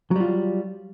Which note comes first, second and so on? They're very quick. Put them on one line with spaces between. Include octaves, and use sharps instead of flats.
F#3 G3 F4